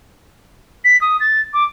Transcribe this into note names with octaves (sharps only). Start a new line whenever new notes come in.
B6
D#6
A6
D6